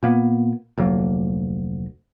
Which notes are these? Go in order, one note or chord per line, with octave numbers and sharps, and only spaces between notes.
A#2 A#3 B3
F1 D2 F#3 A#3